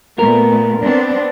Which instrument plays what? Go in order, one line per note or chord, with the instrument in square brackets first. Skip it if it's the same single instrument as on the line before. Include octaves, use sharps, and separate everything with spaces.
[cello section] A#2 A3 B3 [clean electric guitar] A#4
[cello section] B3 C4 D4